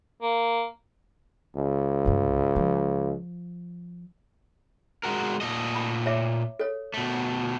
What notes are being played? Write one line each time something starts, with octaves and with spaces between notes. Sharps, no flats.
A#3
C#2
C2 G2
F3
G#3 F#4 A#4
A#2 A3 D#5
B5
C#5 E5 D6
A4 C#5
B2 A3